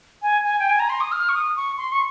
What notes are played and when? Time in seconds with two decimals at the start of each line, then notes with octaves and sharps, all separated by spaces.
0.22 G#5
0.45 G#5
0.59 G5
0.70 G#5
0.80 A#5
0.90 C6
1.01 D#6
1.12 F6
1.29 C#6
1.34 D#6
1.56 C#6
1.78 C6
1.92 C#6